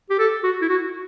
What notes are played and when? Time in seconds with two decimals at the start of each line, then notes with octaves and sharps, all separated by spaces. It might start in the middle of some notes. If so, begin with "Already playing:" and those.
0.10 G4
0.19 A4
0.43 F#4
0.62 E4
0.69 F#4